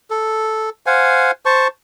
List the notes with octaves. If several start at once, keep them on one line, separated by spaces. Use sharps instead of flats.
A4
C5 F5 F#5 G#5
C5 A5 C#6